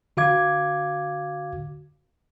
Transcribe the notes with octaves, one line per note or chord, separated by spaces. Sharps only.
D3 F#4 F5 D6 G#6